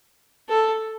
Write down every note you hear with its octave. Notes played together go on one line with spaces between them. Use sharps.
A4